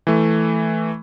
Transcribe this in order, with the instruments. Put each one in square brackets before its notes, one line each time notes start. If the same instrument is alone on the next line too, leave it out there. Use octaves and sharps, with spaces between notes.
[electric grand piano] E3 A3